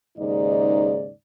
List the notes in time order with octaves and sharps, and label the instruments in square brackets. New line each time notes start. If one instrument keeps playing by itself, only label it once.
[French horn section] D#2 G#2 C#3 D#4 D5